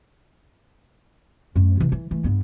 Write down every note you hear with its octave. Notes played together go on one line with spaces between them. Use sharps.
F#2 A3
C3 E3
E3
E3 A3
G2 B3